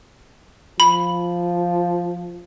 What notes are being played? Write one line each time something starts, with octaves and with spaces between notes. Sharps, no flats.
F3 B5